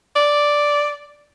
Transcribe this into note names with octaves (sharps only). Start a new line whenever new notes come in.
D5